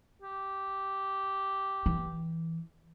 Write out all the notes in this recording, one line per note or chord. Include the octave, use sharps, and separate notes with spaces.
G4
E3